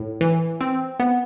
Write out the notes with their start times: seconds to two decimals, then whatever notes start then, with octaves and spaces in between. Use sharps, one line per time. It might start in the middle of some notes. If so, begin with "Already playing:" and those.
Already playing: A2
0.21 E3
0.61 C4
1.00 B3